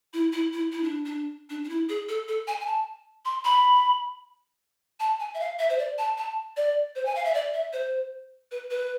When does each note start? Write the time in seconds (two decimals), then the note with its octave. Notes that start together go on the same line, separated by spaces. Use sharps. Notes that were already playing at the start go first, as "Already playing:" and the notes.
0.13 E4
0.33 E4
0.53 E4
0.72 E4
0.83 D4
1.06 D4
1.50 D4
1.64 D4
1.69 E4
1.89 G#4
2.09 A4
2.28 A4
2.48 G#5
2.60 G#5
2.66 A5
3.25 C6
3.45 B5
5.00 A5
5.20 G#5
5.34 E5
5.40 F5
5.59 E5
5.70 C5
5.78 D5
5.98 A5
6.18 A5
6.57 D5
6.95 C5
7.05 G#5
7.15 F5
7.25 E5
7.34 D5
7.54 E5
7.73 C5
8.51 B4
8.71 B4